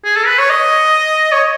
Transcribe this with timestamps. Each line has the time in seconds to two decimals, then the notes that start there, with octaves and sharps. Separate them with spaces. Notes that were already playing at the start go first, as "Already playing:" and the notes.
0.04 G#4
0.16 A4
0.27 B4
0.38 C#5
0.50 D#5
1.32 C#5